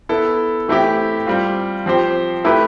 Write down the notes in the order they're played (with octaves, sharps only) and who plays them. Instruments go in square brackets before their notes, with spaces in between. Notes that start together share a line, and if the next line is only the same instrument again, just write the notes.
[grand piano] B3 E4 A4
E3 A3 C4 E4 G4
G3 C4 F4
F3 C4 G4 C5
A3 E4 G4 B4